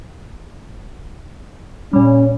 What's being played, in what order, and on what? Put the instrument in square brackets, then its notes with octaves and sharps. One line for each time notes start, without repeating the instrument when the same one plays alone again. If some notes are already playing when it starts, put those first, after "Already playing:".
[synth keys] A#2 G3 [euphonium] C#4